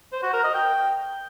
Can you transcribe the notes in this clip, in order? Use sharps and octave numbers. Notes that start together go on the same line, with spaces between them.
C5
F#4
A#4
D#5
G5